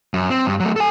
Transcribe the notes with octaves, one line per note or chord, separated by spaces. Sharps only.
F#2
C4
G2
F#3 A3
A4 G#5